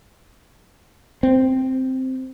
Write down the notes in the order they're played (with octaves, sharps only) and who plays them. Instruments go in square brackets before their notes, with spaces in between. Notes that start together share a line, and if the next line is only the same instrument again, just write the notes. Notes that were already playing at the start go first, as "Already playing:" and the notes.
[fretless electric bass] C4